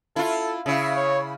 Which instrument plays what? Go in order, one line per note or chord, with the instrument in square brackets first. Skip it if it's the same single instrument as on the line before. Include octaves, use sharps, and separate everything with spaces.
[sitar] E4 F4 [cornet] A4
[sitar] C#3 E4 [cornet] E5
[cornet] C#5